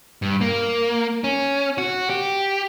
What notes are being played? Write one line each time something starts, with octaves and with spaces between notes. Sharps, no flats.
G2
A#3
C#4
F#4
G4